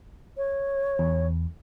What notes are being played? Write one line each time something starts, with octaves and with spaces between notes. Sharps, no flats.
C#5
E2